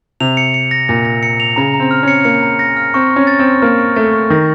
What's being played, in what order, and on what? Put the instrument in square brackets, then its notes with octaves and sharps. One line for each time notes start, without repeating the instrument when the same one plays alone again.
[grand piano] C3 [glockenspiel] F7
[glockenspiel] C#7
C#7
A#6
[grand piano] A#2 [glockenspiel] A#6
[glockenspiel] A#6
C#7
F7
[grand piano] C#3 [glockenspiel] A#5
[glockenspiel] A#5
[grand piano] C4
[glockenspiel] F6
[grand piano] C#4 [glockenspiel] C#7
[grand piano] A#3 [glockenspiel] C#7
[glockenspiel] A#5
A#6
F6
[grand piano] C4 [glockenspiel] C#6
[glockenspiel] C#6
[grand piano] C#4
[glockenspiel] A6
[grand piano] C4
[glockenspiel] A6
[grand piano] A#3 [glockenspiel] F6
[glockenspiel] C#6
[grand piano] A3 [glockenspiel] A6
[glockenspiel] C#6
[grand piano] D#3 [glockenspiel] A#6